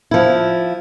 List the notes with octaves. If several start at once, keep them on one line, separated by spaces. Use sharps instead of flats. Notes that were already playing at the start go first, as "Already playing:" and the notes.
F3 E4